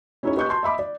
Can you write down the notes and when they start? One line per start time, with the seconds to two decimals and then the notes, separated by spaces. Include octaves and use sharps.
0.23 C#4 D#4 E4 F#4 G#4 C#5
0.36 G4 B4 D#5 C#6 F#6 G6
0.49 A5 C6 G6
0.63 D#5 E5 B5 D6
0.79 D5